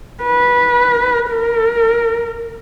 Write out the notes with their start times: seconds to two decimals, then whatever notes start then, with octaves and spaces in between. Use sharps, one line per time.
0.24 B4
1.30 A#4